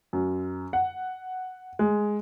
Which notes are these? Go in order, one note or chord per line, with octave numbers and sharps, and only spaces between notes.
F#2
F#5
G#3